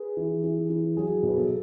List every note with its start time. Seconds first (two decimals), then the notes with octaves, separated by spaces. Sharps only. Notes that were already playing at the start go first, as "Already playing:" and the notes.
Already playing: G#4 B4
0.17 E3
0.44 E3
0.70 E3
0.97 F#3 G#4
1.23 B1
1.28 B4
1.37 A4